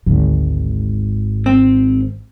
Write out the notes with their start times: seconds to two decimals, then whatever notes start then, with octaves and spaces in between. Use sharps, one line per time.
0.07 G#1 D2 G#2 D3 F#3
1.46 C4